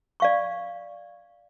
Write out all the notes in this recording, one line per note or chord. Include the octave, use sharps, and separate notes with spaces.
D5 F5 C#6